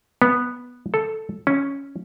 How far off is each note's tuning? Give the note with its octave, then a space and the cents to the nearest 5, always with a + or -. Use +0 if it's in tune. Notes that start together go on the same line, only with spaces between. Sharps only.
B3 -5
A4 +0
C#4 +0